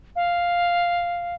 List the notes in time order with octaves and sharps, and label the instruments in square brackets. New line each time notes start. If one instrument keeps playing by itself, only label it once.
[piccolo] F5